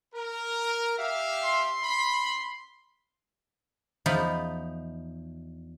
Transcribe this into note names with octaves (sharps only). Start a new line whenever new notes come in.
A#4
G4 E5 F5
C6
B5
E2 F3 D#4 B5